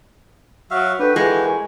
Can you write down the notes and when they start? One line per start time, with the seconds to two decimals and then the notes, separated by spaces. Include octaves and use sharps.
0.71 F#3 F#4 E5 F5
0.99 D4 F#4 G4 A4 B4
1.16 E3 G#3 F4 A4
1.46 A#4 G#5